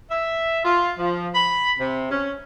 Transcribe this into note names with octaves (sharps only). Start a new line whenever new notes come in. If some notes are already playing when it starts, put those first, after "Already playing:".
E5
F4
F3
B5
C3
C#4